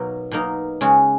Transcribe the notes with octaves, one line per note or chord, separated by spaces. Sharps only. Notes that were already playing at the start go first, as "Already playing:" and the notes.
Already playing: B2 F#3 A#3 D#4 A#4
B2 F#3 A#3 D#4 A#4
C#3 G#3 C#4 F#4